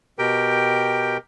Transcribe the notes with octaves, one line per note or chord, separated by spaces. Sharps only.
B2 G4 A#4 G5